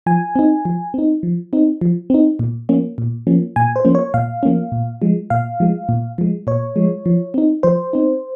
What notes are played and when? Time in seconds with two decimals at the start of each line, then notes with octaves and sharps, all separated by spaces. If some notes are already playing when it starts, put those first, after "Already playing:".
0.06 F3 G#5
0.36 C4 D#4
0.65 F3
0.94 C4 D#4
1.23 F3
1.53 C4 D#4
1.81 F3
2.10 C4 D#4
2.39 A#2
2.69 F3 A#3 C#4
2.98 A#2
3.27 F3 A#3 C#4
3.56 A#2 G#5
3.76 C5
3.85 F3 A#3 C#4
3.95 C#5
4.14 A#2 F5
4.43 F3 A#3 C#4
4.72 A#2
5.02 F3 G#3
5.30 A#2 F5
5.60 F3 G#3
5.89 A#2
6.18 F3 G#3
6.47 A#2 C#5
6.76 F3 G#3
7.06 F3
7.34 C4 D#4
7.63 F3 C5
7.93 C4 D#4